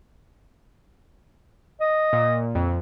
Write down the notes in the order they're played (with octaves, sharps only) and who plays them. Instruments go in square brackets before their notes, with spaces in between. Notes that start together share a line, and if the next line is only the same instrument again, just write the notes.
[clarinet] D#5
[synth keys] A#2
F2